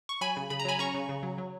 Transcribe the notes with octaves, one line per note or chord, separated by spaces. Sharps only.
C#6
F#3 G#5 B5
C#3
C#3 B5
A#5
F#3 G#5 B5
C#4 A#5 C#6
C#3
C#3
F#3
F#3